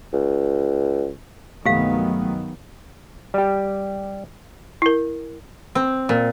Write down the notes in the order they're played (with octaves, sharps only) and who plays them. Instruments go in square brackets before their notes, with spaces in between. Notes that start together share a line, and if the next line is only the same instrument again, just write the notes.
[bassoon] C#2
[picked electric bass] C2 G2 [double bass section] D#3 F#3 B3 [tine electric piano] A3 [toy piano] G4 F5
[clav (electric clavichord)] G3 G4
[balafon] E4 A#4
[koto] C4
A#2